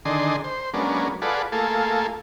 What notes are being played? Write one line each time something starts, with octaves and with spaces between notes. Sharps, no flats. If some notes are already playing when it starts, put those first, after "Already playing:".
D3 D#3 D4 G#4 D#5 C6
C5
F#3 G#3 A#3 B3 C#4 D4
F4 G#4 A4 B4 D5 F#5
A3 A#3 F4 G#4 A4